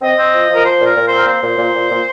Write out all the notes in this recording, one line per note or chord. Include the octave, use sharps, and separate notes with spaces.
C4 D#5
C4
F3
F3
A#4
F3 C5
A#2
A#4
A#2
C5
C4
A#4
A#3 C5
A#2
A#2
A#2
A#2